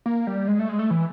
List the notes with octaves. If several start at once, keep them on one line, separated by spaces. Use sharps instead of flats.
A#3
G3
G#3
A3
G#3
A3
E3